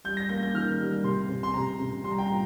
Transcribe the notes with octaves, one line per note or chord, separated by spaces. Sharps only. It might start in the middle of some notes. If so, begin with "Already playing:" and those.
G3 G6
A#6
A#3 G6
G6
D#3 F6
G3
C3 C6
C3
C6
C3 A#5
C3
G3 C6
A#5
G5
A#2 A#5